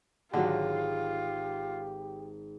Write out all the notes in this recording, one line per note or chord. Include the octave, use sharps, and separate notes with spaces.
G#1 D3 F#3 F4 G4 C#5 A#6